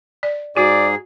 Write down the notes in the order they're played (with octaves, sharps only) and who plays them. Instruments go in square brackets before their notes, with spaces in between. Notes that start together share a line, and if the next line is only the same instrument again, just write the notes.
[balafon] D5
[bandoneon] G#2 G#4 [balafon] F#4 [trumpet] D5